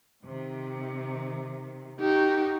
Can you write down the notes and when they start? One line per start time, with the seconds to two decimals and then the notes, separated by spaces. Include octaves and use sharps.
0.25 C3 D#3
2.00 D#4 F#4 G4 A#4